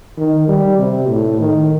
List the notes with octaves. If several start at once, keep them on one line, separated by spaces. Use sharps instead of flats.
D#3
G3
C3
A2
D#3